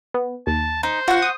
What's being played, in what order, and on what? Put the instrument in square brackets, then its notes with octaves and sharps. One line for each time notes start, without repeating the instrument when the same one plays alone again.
[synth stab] B3
[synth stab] D#2 [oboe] A5
[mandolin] D#4 [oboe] C5
[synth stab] F4 [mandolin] F#4 F#5
[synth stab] D#6